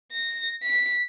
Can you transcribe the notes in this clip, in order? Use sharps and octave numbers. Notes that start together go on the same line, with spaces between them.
A#6
B6